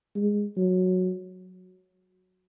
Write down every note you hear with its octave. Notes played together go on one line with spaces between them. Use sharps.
G#3
F#3